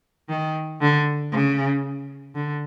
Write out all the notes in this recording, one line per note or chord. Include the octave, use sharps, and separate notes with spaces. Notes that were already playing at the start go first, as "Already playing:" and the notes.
D#3
D3
C#3
D3